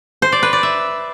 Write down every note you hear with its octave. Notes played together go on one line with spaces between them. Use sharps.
C5
D5
B4
D5
E5